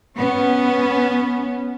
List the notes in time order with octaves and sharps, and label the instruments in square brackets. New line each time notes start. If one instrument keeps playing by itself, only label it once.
[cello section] B3 C#4